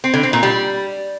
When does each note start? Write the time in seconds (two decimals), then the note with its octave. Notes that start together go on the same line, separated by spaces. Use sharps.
0.04 C4
0.14 D3
0.23 C4
0.33 A#2
0.43 G3